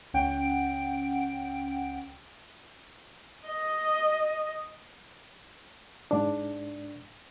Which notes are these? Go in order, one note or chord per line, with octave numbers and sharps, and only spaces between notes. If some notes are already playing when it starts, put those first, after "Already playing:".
C#2 C#4 F#5 G5 D7
D#5
G#2 D4